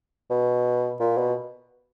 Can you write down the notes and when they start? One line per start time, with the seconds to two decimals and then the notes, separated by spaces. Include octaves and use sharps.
0.30 B2
1.00 A#2
1.18 B2